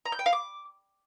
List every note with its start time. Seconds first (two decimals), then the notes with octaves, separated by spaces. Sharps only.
0.05 A#5
0.12 G6
0.19 G5
0.26 F5
0.33 D6